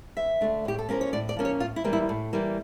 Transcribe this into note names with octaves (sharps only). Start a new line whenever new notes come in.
E2 E5
D3 A3 D4
A2 G4
A4
F3 A#3 C#4 A#4
C#5
A2 D5
D5
F3 A#3 C#4
C#5
A2 F4
E4
E3 G3 A#3
E4
A2
E3 G3 A#3